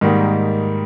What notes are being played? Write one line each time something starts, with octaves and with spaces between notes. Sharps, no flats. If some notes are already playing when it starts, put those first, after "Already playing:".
G#2 D#3 G3 A#3